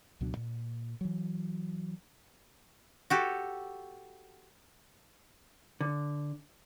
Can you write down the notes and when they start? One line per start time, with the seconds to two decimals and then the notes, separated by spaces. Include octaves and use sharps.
0.21 C#2 B2 F#3 D4
0.37 A#2
1.01 E3 F#3
3.10 F#4 G4 A4
5.81 D3